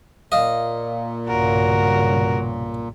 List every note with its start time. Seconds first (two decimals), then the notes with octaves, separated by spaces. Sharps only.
0.32 A#2 D#5 F5
1.27 B1 G2 C#3 F#4 A#4